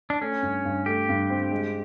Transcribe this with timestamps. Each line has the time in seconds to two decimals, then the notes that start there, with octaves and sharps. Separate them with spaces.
0.10 D4
0.21 A3 C#4
0.42 G2
0.65 G2
0.86 A3 G4
1.09 G2
1.30 C4
1.51 G#3